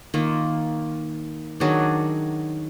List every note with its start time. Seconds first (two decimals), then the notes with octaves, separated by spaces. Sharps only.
0.14 D#3 A#3 F4
1.60 D#3 F#3 D4 G#4